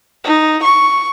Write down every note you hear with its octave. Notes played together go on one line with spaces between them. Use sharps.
D#4
C#6